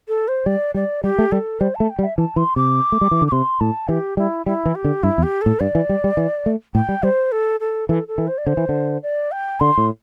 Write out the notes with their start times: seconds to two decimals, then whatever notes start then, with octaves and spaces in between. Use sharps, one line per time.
0.08 A4
0.28 C5
0.46 G3 D5
0.74 G3 D5
1.03 G3 G4
1.19 A3
1.32 G3 A4
1.60 G3 C5
1.75 A5
1.80 A3
1.90 G5
1.99 G3
2.04 E5
2.18 E3 A5
2.36 E3 C6
2.56 C3 D6
2.92 A3
3.01 G3
3.11 E3
3.22 D3
3.28 D6
3.32 C3 C6
3.60 A2 A5
3.89 E3 G4
4.17 G3 E4
4.46 G3 E4
4.66 E3
4.75 G4
4.85 D3
5.03 G2 E4
5.18 E2
5.23 G4
5.41 A2 A4
5.60 G2 D5
5.75 E3
5.89 G3
6.04 G3
6.17 E3
6.46 A3
6.75 A2 G5
6.89 G3
7.03 G3 C5
7.32 A4
7.60 A4
7.89 E3 A4
8.08 A4
8.18 E3
8.27 C5
8.38 D5
8.46 D3 C5
8.57 E3
8.69 D3
9.03 D5
9.32 G5
9.60 D3 C6
9.78 A2